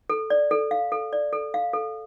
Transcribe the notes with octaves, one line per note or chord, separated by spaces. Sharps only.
A4
D5
A4
F5
A4
D5
A4
F5
A4